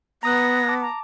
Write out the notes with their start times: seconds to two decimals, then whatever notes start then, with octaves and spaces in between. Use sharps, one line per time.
0.23 B3 A#5 D#6 F#6 A#6
0.68 A5 D6
0.82 A#5